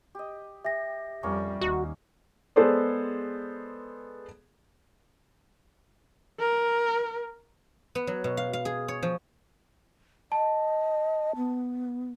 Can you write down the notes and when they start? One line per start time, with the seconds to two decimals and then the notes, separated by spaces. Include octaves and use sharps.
0.15 G4 D#5
0.65 G4 E5 A#6
1.23 F2 G3 A#3 C#4 C#5
1.61 D#2 D#4 F#4
2.56 G#3 B3 G#4 A4 C5 D5
6.39 A#4
7.95 B3
8.07 F#3
8.24 B2
8.37 F5
8.53 F5
8.65 G#4
8.88 C#5
9.03 F3
10.32 D#5 A5
11.36 B3